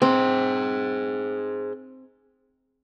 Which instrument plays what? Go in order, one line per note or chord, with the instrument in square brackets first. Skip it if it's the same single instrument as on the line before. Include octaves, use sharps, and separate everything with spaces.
[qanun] C4 [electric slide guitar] G#4 C5